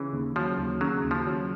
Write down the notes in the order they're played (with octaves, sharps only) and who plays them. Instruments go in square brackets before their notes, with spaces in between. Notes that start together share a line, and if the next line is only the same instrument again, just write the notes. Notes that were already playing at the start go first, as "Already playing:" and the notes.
Already playing: [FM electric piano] C#3 [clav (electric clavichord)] E3
[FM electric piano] D#2
[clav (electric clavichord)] F3 [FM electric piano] F#3
[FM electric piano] D#2
[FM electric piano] C#3 [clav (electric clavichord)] F#3
[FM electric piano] D#2
[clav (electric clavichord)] F3
[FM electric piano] F#3